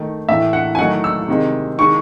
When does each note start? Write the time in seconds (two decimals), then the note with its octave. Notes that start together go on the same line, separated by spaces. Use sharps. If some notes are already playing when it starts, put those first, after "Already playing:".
Already playing: D#3 A3
0.28 A2 E3 A3 E5
0.53 F#5
0.75 G#5
0.79 D#3 F#3 A3 F#5
1.04 E6
1.28 C3 D#3 G#3
1.78 D#3 G#3 C#6